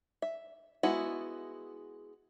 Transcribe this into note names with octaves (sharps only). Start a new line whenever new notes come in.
E5
G#3 B3 E4 F#4